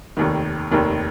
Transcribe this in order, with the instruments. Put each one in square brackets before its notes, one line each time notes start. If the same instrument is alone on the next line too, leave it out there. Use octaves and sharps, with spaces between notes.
[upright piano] F1 D#2 D#3
F1 D#2 D#3